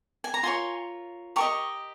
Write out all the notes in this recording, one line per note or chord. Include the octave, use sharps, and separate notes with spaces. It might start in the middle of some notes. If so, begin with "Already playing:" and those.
G#5
A#5
F4 A#4 C#5 G#5 C6
G4 A#4 D#5 A#5 C#6